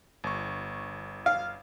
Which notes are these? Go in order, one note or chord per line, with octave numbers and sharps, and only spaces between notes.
G1 C#6
F5